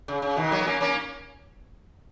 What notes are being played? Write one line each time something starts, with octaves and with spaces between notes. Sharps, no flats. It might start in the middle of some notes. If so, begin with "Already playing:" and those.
C#3
C#3
B2 D#3
F#3 A#3
B3
A#3 C#4
A#3 C#4